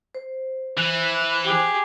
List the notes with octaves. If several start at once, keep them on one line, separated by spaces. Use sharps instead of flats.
C5
E3 F#6
G4 G#4